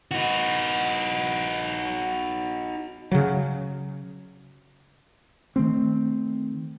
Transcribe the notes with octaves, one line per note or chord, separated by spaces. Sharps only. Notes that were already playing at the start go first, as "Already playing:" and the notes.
D#4 F#4
C#3 F#3
D#3 A3 C4